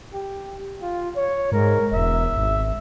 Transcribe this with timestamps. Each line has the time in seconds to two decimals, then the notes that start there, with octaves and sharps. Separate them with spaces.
0.13 G4
0.82 F4
1.16 C#5
1.52 G#2 A#4
1.92 E1 E5
2.34 G#1